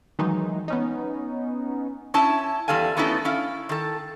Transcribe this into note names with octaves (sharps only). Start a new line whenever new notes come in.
D#3 E3 F#3 G#3 D#4
B3 C#4 D#4
C#4 E4 E5 A5
E2 G3 A4 F5 G#5
A3 B3 C#4 D#4 E4 A4
C#4 E4 F5
D#3 A4